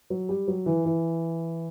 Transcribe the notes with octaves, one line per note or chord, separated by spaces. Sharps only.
F#3
G3
F#3
E3
E3